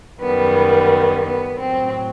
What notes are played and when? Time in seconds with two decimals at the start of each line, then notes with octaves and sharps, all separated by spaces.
0.20 F#2 D#3 G3 B3
1.24 B3
1.59 A2 F#3 C4